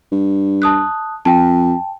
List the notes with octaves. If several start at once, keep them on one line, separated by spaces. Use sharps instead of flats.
G2
A5 D#6 F#6
F2 G5 A5